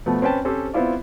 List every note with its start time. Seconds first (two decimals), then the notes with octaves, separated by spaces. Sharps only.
0.06 B2 F3 A3 B3
0.22 C4 C#4 B4 G5 A5
0.45 C4 C#4 G4 A4 C5
0.73 B3 C4 E4 F4 D5